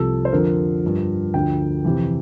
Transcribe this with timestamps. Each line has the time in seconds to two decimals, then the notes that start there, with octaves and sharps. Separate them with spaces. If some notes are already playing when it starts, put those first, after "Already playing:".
Already playing: C2 C3 F3 A4
0.25 C5
0.32 F2 D3 F3 A#4
0.84 G2 F3
1.34 D2 D3 F3 G5
1.85 F2 C3 E3